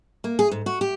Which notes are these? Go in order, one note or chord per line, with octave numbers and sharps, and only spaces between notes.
A#3
G#4
G#2
F#4
G4